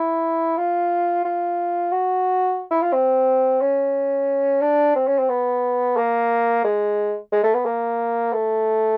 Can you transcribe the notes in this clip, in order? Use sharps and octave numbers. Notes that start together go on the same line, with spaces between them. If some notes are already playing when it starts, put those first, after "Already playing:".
Already playing: E4
F4
F4
F#4
E4
F4
C4
C#4
D4
C4
C#4
C4
B3
A#3
G#3
G#3
A3
B3
A#3
A3